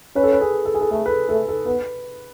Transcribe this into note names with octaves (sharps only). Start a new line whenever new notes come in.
C#4 B4
A4
B4
G#4
A4
G#4
A4
A3 A4
B4
A4
A3 A4
A4
B3 B4